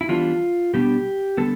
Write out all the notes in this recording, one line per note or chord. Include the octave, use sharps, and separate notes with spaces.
E4
E3 G3 B3 D4 F4
B2 G3 B3 D4 G4
D3 G3 B3 A4